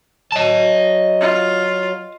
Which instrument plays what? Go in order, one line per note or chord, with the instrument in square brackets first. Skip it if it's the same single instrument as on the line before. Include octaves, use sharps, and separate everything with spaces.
[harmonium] F#3 [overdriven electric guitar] D#5 A5
[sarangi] F4